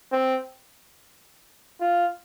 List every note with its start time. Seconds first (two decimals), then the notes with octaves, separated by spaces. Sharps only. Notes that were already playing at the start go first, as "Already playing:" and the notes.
0.12 C4
1.81 F4